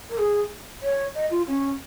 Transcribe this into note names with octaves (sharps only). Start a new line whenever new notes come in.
A#4
G#4
C#5
D#5
F4
C#4